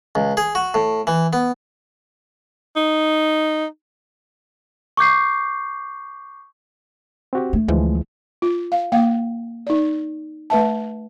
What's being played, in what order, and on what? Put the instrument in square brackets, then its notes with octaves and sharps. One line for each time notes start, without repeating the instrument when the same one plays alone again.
[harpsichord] C#2
G#4
F#4
A2
E3
B3
[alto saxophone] D#4
[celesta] C#6 D6 G6 C7
[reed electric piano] C4 F#4 G4
[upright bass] A3
[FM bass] D2 [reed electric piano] E3 F3 G#3
[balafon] F4
F5
A#3 F5 G5
D#4 D5
A3 B4 E5 A5